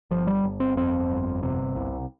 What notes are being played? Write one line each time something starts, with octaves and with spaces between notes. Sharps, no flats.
G1 F3
G3
G1
C4
F2 C4
G1
C3
C2